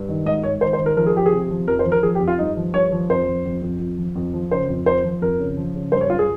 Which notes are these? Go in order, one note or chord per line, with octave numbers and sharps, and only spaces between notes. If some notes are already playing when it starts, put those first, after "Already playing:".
Already playing: G2
D#3
G#2 D#5
G#2 C#5
D#3 C5
C5
D#3
A#4
F3 A#4
G#4
F3 G4
G#4
C3
F3
F2 A#4
C5
F3
A#4
F3 G#4
G4
F2
F4
G2 D#4
F3
G2 C#5
F3
F2 C5
F2
F2
F2
F2
F3
F2
F3
C#3 C5
F2
F2 C5
F3
F2 A#4
C#3
F3
C#3
G2 C5
C#5
G2 F4
G#4